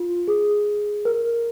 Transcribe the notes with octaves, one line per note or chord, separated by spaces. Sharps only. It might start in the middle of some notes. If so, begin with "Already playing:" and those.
Already playing: F4
G#4
A#4